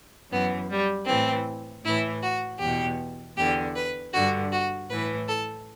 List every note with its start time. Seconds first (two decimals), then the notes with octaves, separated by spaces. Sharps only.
0.31 F#2 E3 B3
0.69 G3
1.07 A2 E3 C4
1.85 A2 E3 E4
2.23 F#4
2.60 E2 B2 G4
3.37 E2 D3 G4
3.76 B4
4.13 G2 D3 F#4
4.52 F#4
4.90 A2 E3 B4
5.28 A4